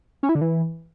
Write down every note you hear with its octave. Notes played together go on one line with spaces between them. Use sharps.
C#4
E4
D3
E3